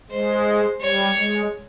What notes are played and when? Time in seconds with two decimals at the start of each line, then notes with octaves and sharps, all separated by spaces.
0.11 G#3 C5
0.81 G3 C#5
1.17 G#3